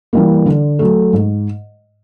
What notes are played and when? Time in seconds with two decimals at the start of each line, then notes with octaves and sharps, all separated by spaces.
0.13 E3 G3 A#3
0.46 D3
0.79 F#3 A3
1.13 G#2